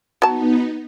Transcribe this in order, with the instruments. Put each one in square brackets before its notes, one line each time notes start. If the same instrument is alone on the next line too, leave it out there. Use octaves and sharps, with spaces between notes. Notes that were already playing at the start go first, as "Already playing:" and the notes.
[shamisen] F#3 A5 [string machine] B3 D#4